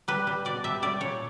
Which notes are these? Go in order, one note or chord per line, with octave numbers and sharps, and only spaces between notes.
G3 B4
G3
B2 D5
G3 E5
G3 D5
A#2 C#5